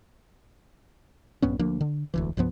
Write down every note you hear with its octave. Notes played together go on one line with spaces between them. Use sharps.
A#1 G2 B3 C#4
D2 F3 A#3 D4
D3
E1 D2 E3
C2 G2 F3 B3